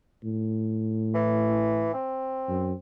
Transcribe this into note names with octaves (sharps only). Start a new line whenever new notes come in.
A2
E3
C4
F#2